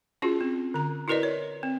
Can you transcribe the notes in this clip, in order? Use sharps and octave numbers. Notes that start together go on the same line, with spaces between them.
C#4 F4 F#4 G#4
C4
D3 A#5
E4 F#4 A#4 B4 D5 D#5
C#5
C4